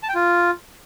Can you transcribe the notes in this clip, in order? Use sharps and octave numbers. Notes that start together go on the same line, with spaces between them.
A5
G5
F4